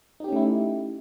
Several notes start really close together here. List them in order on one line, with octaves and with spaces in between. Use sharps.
D#4 G4 C#4 A3 E4